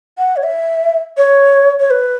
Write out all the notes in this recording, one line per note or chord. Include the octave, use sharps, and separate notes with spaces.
F#5
C#5
E5
C#5
C#5
B4